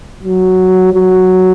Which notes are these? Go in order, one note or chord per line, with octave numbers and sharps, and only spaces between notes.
F#3
F#3